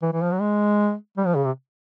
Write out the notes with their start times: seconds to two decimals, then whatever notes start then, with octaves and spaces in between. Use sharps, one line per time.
0.02 E3
0.13 E3
0.22 F3
0.32 F#3
0.41 G#3
1.17 G3
1.26 F3
1.35 C#3
1.45 C3